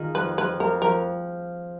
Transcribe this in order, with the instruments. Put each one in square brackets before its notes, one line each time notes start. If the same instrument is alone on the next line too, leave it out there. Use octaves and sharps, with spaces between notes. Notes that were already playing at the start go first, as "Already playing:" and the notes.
Already playing: [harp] D#3 F4 G#4
[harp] F2 [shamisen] B4
[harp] F2 [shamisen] B4
[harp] F2 [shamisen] A#4
[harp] F3 [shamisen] A#4